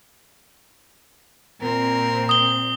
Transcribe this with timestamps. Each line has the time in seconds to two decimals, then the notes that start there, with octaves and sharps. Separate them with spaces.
1.62 A#2 C4 A#4
2.29 D#6 G7